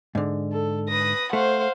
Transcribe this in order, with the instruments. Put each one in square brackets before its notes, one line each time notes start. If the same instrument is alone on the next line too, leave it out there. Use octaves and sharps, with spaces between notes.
[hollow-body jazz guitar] G#2 D3
[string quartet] A4
B4 D#6 A#6
[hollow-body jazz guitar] A3 [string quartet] C5 F5 F#5